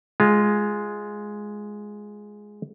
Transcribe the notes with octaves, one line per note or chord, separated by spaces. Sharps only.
G#3 F4